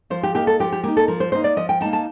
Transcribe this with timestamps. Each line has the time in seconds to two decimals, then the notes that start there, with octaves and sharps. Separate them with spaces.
0.10 F3 C5
0.23 G4
0.35 A#3 D#4 G4
0.47 A4
0.59 F3 G4
0.72 G4
0.84 A#3 D#4 G4
0.97 A4
1.08 F3 A#4
1.20 C5
1.32 A#3 D#4 C5
1.44 D5
1.56 F3 D#5
1.69 G5
1.81 D#4 A5
1.86 A#3
1.93 A5